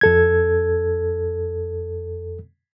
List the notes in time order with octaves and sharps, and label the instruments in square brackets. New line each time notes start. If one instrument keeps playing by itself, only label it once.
[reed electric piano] F2 A4 G#6